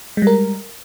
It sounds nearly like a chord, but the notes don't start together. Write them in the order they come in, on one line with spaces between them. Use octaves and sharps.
G#3 G3 A#4